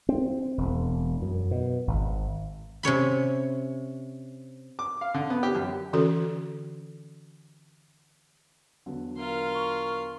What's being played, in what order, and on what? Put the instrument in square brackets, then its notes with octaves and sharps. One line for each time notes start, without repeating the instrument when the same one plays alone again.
[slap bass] C4
E1
F#2
B2
G#1
[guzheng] C3 C#4 C#5 B5
[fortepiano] D6
F5
D3
B3
G4
F#2
[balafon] D3 E3 C#4 F#4 A4
[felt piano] E2 D3 F#3
[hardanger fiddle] F4 C6 [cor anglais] A#4
[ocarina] C#6